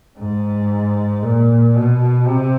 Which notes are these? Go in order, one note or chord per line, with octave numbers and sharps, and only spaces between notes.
G#2
A#2
B2
C3